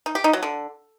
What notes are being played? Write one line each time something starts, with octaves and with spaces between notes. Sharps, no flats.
D#4
G4
D#4
F#3
D3